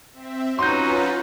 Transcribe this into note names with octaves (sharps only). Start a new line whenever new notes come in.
C4 E5
F#3 C#4 D#4 F4 F#4 B4 C6 G6